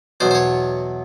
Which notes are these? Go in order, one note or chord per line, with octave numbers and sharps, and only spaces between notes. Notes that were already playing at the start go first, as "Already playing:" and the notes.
E2 B2 F#3 B3 C5
C5
C#5